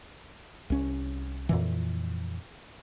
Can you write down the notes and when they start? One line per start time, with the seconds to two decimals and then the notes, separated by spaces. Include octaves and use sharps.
0.70 C2 C#4
1.49 F2 A#2 E3